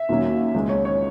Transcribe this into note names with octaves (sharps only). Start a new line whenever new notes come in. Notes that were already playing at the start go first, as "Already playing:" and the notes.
Already playing: E5
D#2 D#3 F#3 A#3 C#4
C#2 C#3 G#3
C#5
C#5